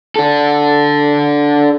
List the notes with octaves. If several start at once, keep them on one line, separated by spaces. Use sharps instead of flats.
D4 A4